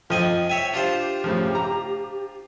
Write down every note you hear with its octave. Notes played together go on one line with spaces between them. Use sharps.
F2 F3 D#5 G5 G#5
C#5 E5 G#5
D4 F4 G4 C5
A2 C#3 F3
A#5